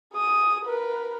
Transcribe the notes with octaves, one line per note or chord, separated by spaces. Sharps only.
G#4 D#6
A#4 B4